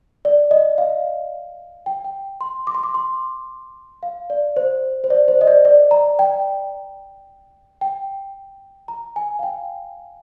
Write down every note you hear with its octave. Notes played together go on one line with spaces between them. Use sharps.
D5
D#5
F5
G5
G5
C6
D6
C6
D6
C6
F5
D5
C5
C5
D5
C5
D#5
D5
D5
A#5
G5
G5
A#5
G#5
F5
G5